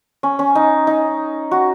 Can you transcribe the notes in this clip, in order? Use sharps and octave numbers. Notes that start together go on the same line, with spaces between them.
C#4
C#4
D#4
D#4
F#4